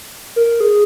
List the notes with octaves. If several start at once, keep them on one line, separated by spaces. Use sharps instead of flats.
A#4
G#4